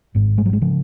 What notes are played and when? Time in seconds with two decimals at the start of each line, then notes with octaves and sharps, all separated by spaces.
0.15 G#1 G#2
0.38 G#3
0.46 F#3
0.53 G#3
0.61 C#3 F3